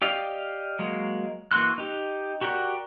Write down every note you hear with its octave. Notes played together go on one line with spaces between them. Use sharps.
G4 D5 D#5 F5
F#3 G#3 A#3
E3 A#3 F#4 C6 F#6
D#4 G4
F#4 G4 A#4 D5 F#5